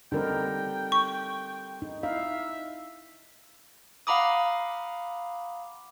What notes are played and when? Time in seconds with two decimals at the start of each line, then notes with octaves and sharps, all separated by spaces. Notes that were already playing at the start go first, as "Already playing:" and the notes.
0.12 D3 G3 C4 D#4 A#4 G5
0.92 C#6
1.82 D#4
2.03 D#4 E4 E5 F5
4.07 F5 F#5 A#5 B5 D6 D#6